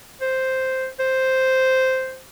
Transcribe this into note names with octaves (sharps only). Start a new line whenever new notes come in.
C5
C5